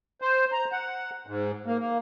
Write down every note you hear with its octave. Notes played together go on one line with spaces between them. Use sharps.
C5
A#5
F#5
G#2
A#3
A#3